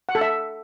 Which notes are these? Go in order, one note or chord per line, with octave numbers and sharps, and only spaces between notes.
F#5
A4
E5